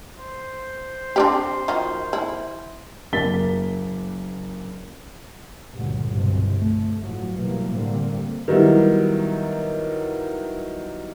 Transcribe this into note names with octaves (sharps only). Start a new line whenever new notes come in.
C5
C4 D4 G4
D#3 F#3 F4
E4
F#1 A#3 A6 B6 G7
C#2 G2 A#2 D3 F#3
G1 C2 B2 C4
A3
A1 A2 F3 F#3
B2 E3 F#3 G3 A#3
A2 D3 G3 A#3 C4
D#3 F#3 G3 B3 E4